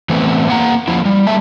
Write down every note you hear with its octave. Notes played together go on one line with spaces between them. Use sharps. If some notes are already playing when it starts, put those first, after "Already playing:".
E3 A3 B3 C4
A#3 F#5 A#5
F3 A#3 E4
G3
G3 A#3 E5 A5